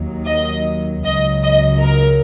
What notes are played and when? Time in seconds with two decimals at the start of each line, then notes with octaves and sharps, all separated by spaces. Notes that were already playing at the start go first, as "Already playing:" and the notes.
Already playing: D#2 D#3 F#3
0.27 D#5
1.05 C#2 C#3 F#3 D#5
1.43 D#5
1.82 A#4